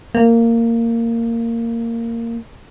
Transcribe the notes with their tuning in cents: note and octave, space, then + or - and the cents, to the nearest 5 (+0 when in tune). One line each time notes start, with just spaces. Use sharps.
A#3 -15